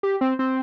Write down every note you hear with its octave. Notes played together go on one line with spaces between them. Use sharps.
G4
C4
C4